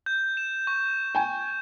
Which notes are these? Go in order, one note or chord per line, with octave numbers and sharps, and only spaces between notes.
G6
E7
C#6
G5 G#5